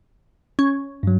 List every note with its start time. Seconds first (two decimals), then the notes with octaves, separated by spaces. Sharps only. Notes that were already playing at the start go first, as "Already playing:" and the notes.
0.59 C#4
1.03 G2 F#3